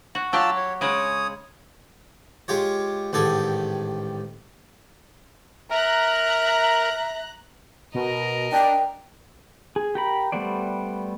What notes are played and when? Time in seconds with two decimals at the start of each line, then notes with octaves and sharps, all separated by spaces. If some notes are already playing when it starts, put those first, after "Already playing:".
0.15 F#4
0.33 F#3 F4 G4 A5 E6
0.56 C#5
0.81 C#3 G#3 C#5 D#6
2.48 G#3 F4 G4 C#5
3.13 A1 G#2 D#3 G4 A4 G#5
5.70 A#4 E5 A#5 F#6
7.94 B2 A#4 D#5
8.52 D4 G5
9.76 G#4
9.95 G4 A#4 B5
10.32 G3 A3 B3 C5 D5